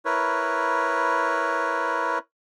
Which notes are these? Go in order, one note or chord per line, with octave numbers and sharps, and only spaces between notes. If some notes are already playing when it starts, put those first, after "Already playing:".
E4 A#4 B4 C#5